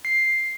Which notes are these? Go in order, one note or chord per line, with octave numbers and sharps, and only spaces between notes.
C7